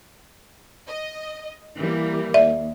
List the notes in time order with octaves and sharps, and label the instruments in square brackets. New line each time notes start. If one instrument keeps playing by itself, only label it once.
[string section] D#5
E3 G3 A#3
[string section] D#2 [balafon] D5 E5